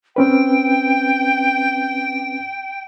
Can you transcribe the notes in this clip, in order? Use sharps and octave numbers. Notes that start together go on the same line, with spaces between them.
C4 C#4 B4 G5